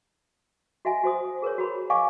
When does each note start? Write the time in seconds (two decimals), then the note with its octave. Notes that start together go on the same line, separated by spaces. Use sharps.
0.85 F#4 D#5 E5 G#5
1.04 F#4 C5 D#6
1.42 G#4 A#4 B4 C#5
1.58 F#4 C#5 B5
1.90 D5 D#5 F5 G#5 C#6 D6